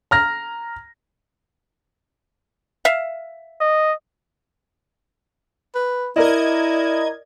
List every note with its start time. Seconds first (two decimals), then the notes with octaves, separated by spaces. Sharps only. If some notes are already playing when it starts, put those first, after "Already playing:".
0.11 A#5 F6 A#6
2.85 E5 F5
3.60 D#5
5.75 B4
6.16 E4 A#4 D5 D#5 G#6